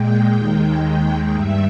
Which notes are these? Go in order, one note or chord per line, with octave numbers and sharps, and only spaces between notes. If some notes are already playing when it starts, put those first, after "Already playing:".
Already playing: A#2 G#3 G5
D#2 D#3 G#3
D#2 D#3 G#3
G2 G3 E5